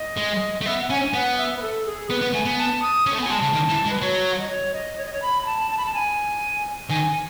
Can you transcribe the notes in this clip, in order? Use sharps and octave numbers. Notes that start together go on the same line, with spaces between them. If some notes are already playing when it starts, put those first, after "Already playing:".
Already playing: D#5
G#3
A3
B3 E5
F#5
C#4 G#5
B3 F#5
E5
B4
A4
G#4
B3 B4
B3
A3 G#5
B3
A5
D#6
C#4
A3
B3
G#5
F#3
G#3 A5
C#3
D#3
E3
G#3
B4
F#3 C#5
D#5
C#5
D#5
C#5
D#5
C#5
B5
B5
A5
A5
B5
A5
G#5
D#3 G#5